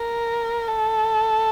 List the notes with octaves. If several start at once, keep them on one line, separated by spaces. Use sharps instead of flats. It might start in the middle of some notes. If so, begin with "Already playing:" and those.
Already playing: A#4
A4